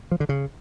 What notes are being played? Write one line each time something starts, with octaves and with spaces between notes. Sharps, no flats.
F3
D3
C#3